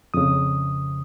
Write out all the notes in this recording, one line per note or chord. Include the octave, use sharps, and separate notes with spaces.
F2 C#3 D#6